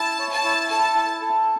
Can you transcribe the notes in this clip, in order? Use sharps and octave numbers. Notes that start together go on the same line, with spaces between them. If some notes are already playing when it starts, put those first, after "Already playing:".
Already playing: E4 A5
C#5
A5
E4
A4 A5
E4
A4